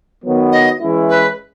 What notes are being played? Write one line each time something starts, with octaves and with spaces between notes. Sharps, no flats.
D#3 F#3 B3
D#5
E3 G#3 C#4 E4
B4